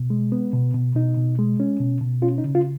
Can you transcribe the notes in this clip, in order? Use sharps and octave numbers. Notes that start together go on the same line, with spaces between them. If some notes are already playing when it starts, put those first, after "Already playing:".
Already playing: B2
G#3
B3
B2
B2
B2 D#4
B2
G#3
C#4
B2
B2
C#4 F4
D#4
C#3
F4